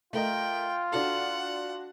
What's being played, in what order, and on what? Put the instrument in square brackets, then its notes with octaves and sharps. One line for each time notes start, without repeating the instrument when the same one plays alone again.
[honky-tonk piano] A3 A#4 D#5 [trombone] F4 [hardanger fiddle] G5
[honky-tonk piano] D4 F#4 A4 [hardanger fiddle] F#5